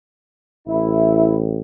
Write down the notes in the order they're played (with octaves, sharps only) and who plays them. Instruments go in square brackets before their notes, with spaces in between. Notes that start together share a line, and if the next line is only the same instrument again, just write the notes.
[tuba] A1 [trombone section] E4